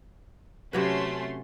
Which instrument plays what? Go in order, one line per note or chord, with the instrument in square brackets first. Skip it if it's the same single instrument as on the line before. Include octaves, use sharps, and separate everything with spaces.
[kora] C3 F#3 B4 [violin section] A3 C#4 C6